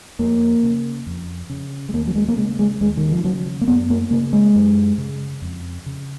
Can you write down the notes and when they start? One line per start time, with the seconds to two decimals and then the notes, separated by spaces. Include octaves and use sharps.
0.19 F2 A#3
0.63 C#3
1.06 F2
1.50 C#3
1.89 G#3
1.93 D#2 A#3
2.07 F#3
2.15 G#3
2.28 A#3
2.37 C#3 G#3
2.59 G#3
2.81 D#2 G#3
2.97 D#3
3.12 F3
3.24 C#3 F#3
3.61 A#3
3.68 F#2 B3
3.90 A#3
4.11 C#3 A#3
4.33 G#3
4.56 F#2
4.98 C#3
5.42 F2
5.86 C#3